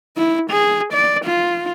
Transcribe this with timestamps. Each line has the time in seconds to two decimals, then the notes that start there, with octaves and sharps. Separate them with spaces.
0.16 E4
0.50 G#4
0.93 D5
1.25 F4